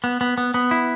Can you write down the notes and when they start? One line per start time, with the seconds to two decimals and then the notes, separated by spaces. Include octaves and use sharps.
0.04 B3
0.21 B3
0.38 B3
0.54 B3
0.71 E4